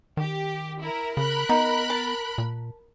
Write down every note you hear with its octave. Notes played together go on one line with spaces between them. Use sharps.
D#3 G4
E4 A#4
C#3 A#4 B5 F#6
B3 D#4
A5
A#2